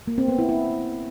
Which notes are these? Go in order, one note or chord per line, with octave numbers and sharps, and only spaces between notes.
A#3
C4
B3
E4
E4